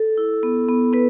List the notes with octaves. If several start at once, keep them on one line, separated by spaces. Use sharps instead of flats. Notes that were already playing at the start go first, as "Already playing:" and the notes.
Already playing: A4
E4
B3
B3
B3 B4